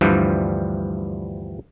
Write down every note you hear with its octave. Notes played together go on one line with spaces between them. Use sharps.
D2 G2 E3 F3 G3